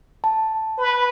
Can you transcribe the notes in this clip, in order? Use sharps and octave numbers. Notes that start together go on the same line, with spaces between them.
A5
B4